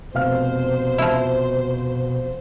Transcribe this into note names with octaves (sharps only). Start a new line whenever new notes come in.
F1 B2 C5 F5 F6
F3 E4